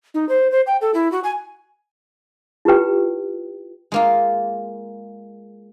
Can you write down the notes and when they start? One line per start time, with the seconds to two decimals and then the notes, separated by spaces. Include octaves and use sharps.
0.14 D#4
0.29 C5
0.52 C5
0.67 G5
0.81 A4
0.94 E4
1.12 F#4
1.24 G#5
2.65 E4 F4 G4 B4 G5
3.92 G#3 A#3 F4